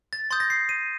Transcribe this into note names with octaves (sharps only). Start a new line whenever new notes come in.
A6
C6 D#6 G6 A6
A#6
C7
D#7